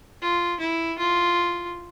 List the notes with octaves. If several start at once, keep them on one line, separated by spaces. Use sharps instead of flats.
F4
E4
F4